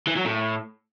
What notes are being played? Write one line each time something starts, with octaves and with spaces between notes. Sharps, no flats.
E3
F#3
A2